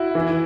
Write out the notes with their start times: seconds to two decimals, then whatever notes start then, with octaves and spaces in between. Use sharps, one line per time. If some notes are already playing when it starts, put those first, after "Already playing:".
Already playing: E4 F#4
0.15 E3